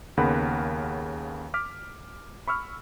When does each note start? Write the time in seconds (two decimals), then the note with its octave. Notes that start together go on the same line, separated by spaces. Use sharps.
0.17 D#2 C#3 B3 A#4 F#5 B5
1.54 D6 F6 B6
2.47 B5 C#6 E6 F6